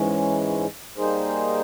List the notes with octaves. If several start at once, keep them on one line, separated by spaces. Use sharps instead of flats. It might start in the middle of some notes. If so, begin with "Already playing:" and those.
Already playing: G#2 E3 G#3 C#4
G3 A#3 D#4 G#4 C5